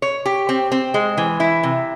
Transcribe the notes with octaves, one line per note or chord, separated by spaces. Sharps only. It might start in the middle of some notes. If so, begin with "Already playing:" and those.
C#5
G4
C4
C4
G#3
E3
E4
C3